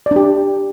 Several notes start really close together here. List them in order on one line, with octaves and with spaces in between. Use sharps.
D5 D4 G4